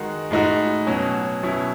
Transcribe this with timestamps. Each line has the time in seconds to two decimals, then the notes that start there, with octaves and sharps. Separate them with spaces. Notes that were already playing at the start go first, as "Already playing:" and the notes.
Already playing: D#3 G#3 D#4 F#4
0.31 A2 G#3 D#4 F#4
0.87 B2 F#3 C#4 F#4
1.43 B2 F#3 C#4 E4